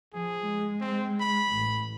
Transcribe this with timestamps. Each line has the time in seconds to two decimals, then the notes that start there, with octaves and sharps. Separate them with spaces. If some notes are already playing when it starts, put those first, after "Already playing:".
0.14 F3 G#4
0.46 G#3
0.80 C4
1.21 B5
1.53 A1